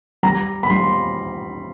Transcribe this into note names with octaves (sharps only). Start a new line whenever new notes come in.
G3 A#5
B5
G3 C6